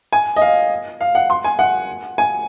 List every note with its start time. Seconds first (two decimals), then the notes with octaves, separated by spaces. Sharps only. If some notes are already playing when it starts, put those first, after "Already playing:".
0.13 G#5
0.36 D#5
0.42 F5
1.01 F5
1.15 F#5
1.30 C6
1.44 G#5
1.59 F#5
2.18 G#5